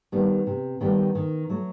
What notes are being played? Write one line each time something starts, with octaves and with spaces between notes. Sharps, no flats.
D#3 G3 B3
C3
D#3 G3 B3
D#3
F#3 A3